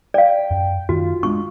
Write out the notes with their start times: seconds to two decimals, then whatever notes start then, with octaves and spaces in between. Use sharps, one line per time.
0.14 D5 F5 G5
0.51 F#2
0.89 F#2 D#3 F4 F#4
1.23 G#3 B3 D4 C#6